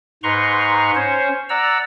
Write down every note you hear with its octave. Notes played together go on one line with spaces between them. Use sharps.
G#2 B4 A#5 C6 C#6
C#4 C5 C#5
D5 F#5 A#5 E6